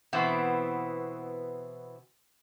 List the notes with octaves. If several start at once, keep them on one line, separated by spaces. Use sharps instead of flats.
B2 E3 B3 C4